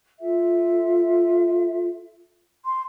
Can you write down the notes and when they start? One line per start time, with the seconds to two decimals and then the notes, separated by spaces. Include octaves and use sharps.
0.20 F4 A4 E5
2.65 C6